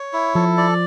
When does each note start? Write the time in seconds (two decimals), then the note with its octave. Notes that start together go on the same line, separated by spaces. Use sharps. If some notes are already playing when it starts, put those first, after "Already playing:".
Already playing: C#5
0.13 E4
0.35 F3 A4
0.58 D5